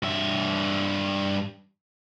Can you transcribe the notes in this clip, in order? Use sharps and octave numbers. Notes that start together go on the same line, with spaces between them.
G2 E5